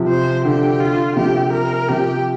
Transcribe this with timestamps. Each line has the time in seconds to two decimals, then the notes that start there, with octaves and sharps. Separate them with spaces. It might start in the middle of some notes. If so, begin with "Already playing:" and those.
Already playing: C3 F3
0.09 C5
0.45 D3 G4
0.80 F4
1.16 C3 F3 G4
1.53 A#4
1.89 C3 F3 G4